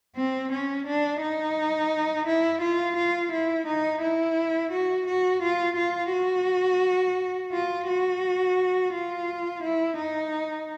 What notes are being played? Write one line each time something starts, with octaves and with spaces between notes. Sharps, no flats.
C4
C#4
D4
D#4
E4
F4
F4
E4
D#4
E4
F#4
F#4
F4
F4
F#4
F4
F#4
F4
E4
D#4